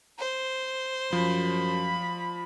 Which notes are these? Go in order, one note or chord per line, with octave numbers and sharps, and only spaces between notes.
C5
F#2 F3 B5